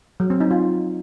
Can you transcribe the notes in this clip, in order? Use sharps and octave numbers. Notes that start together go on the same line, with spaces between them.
F#3
C4
D#4
F4